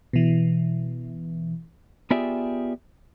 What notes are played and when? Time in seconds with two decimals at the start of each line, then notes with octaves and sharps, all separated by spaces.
0.13 B2 E3
2.11 B3 F4 G4 G#4 D5 E5